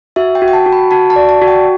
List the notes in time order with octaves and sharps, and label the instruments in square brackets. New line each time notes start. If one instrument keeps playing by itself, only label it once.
[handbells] F#4 [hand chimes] E5
[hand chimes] G5
[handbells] F#4
[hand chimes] G5
A5
[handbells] F#4
[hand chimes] B5
[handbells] F#4 [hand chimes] A5
[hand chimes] A5
[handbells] D5
[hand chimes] A5
[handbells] F#4
[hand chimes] G5